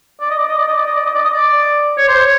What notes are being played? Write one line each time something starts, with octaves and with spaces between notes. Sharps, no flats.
D5
D#5
D5
D#5
D5
D#5
D5
D#5
D5
D#5
D5
D#5
D5
C#5
C5
C#5